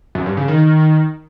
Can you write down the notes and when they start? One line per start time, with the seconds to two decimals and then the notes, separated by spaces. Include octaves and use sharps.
0.15 F#2
0.26 G2
0.37 C#3
0.48 D#3